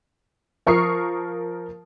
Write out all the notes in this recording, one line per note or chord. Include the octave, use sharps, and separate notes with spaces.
F3 A#4 C#6 D#6 F6 C7